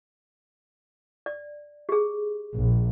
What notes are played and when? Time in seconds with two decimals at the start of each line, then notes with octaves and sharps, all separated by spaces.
1.26 D5
1.89 G4 G#4
2.53 A#1